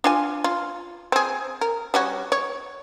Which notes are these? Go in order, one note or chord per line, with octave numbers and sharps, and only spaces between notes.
D4 F4 G#5
F4
C4 G#4
A#4
G3 C#4 F#4
C#5